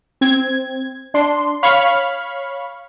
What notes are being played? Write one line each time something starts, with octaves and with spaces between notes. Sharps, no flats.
C4 G#6
D4 C6
C#5 F5 B5 C#6 F6